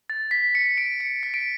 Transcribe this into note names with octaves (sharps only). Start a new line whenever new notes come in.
A6
B6
C#7
D7
C#7
B6
D7